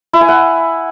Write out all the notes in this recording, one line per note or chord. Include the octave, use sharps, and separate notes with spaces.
E4
G#5
F#5